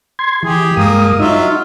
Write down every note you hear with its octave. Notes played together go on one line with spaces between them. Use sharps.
C6 G#6
E3 G4 G#4
G2 G#3 A#3 D#6
F#3 D#4 F4 E5